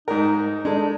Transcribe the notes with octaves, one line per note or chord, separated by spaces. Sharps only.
G#2 D#4 A#4
G#3 D4 A4